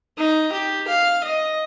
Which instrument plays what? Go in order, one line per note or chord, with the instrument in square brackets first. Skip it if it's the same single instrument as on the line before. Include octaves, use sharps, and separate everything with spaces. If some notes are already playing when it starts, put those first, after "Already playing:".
[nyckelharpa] D#4
G4
F5
D#5